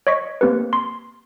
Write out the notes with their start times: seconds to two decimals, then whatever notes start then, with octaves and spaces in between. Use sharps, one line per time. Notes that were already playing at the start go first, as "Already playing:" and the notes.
0.07 C#5 D#5 C#6 B6
0.41 A#3 C4 G4 B4
0.73 C6